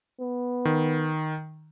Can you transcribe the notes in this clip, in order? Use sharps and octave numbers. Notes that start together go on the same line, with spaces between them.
B3
D#3